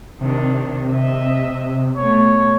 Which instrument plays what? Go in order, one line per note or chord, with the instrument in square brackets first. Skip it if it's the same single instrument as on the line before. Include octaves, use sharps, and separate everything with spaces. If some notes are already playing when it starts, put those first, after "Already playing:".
[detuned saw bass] C3 [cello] D#3 D4
[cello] D#5 E5
[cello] B2 A3 [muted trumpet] C#5